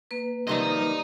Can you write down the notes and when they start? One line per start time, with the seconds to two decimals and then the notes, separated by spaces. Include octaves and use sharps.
0.11 A#3 B4
0.47 C3 D#3 F3 G3 D#5 A#5